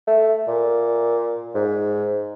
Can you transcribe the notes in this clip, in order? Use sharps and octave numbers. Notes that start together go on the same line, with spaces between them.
A3
A#2
G#2